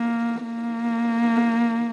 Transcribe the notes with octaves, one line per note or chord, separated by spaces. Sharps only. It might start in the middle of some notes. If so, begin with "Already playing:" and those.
Already playing: A#3
A#3